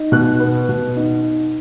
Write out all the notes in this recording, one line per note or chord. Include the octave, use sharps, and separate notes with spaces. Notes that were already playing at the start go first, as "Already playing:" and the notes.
Already playing: D#4
B2 F#6
B3
B2
D#4